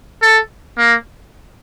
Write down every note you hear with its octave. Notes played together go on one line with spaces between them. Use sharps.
A4
A#3